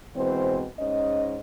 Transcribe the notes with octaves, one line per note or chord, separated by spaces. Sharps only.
B2 E3 G#3 C4 C5
G#2 C#4 D#5